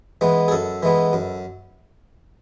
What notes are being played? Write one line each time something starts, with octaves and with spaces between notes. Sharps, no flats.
E3 G#3 B3
G#4
F#2 A4
E3 G#3 B3
F#2